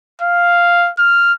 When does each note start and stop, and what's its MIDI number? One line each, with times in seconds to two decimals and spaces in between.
0.22 0.90 77
0.99 1.33 89